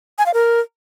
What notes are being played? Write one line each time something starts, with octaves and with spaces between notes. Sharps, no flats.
G#5
F5
A#4